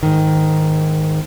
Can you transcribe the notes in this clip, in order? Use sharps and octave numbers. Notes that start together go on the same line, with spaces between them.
G#2 D#3